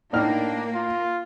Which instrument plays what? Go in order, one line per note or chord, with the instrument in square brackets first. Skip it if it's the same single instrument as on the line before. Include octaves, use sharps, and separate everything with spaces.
[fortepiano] A2 D#4 F6 [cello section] A#3 [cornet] D4
[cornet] F4